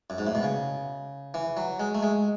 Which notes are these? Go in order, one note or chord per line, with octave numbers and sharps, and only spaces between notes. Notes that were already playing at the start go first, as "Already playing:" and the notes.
F#2
G#2
A2
B2
C#3
E3
F#3
G#3
A3
G#3